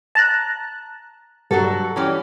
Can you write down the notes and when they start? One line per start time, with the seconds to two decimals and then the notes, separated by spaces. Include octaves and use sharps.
0.15 A5 A#5 F#6
1.51 G2 F#3 F#4 A4
1.96 E3 C#4 G4